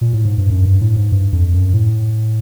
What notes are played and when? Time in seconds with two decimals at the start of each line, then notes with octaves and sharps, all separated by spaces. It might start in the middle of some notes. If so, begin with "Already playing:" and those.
0.01 A#2
0.13 A2
0.25 G#2
0.38 G2
0.50 F#2
0.65 G2
0.81 A2
0.96 G#2
1.12 G2
1.33 F2
1.54 F#2
1.73 A2